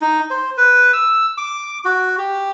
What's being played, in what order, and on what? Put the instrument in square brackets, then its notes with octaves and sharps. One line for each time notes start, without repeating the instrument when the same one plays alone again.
[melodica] D#4
C5
B4
E6
D6
F#4
G4